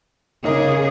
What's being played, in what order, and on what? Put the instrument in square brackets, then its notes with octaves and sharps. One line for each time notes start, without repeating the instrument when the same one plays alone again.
[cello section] C#3 G#4 [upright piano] A#3 D#4 D#5